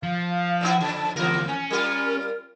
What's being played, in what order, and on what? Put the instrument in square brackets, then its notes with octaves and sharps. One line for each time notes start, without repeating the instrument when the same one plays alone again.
[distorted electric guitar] F3 [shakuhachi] F5
[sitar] A#2 B3 E4
[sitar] F2 C#3 [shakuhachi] A5
[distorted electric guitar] D2 C3 [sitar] E3 A#4 [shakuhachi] F4
[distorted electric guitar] C#4 [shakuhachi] G#5
[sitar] G3 F4 [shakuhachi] A#4